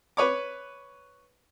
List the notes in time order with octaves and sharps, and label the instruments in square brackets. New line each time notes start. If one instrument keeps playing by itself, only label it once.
[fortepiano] B4 C#5 D6